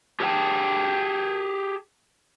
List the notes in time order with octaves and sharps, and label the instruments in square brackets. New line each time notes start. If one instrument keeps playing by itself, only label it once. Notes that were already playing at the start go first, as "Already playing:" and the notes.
[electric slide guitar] G4 G#4 B4 F#5 G5 A5